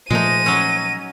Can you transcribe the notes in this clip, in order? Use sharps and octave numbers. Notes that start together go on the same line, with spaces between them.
A#2 F3 G#3 A3 D#4 A#6 D#7
F#3 C#4